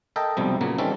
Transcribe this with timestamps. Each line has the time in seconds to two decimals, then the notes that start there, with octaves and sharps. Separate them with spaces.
0.16 A4 A#4 D#5 E5 G5 A5
0.37 B1 F2 C3 F3 G3
0.61 A#2 C#3 F#3 A#3 B3
0.78 D#3 E3 G3 C4 C#4 A4